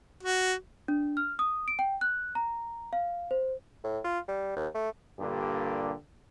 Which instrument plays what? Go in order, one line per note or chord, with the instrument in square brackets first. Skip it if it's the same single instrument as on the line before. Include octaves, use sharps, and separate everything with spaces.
[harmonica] F#4
[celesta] D4
F6
D#6
D7
G5
F#6
A#5
F5
C5
[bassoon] A2
F4
G3
D#2
A3
[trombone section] G2 A#2 D3 A#3 G4 A4